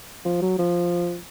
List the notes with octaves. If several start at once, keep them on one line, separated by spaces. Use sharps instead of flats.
F3
F#3
F3